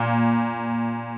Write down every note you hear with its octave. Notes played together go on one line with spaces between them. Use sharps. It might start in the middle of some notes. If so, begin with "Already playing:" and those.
Already playing: A#2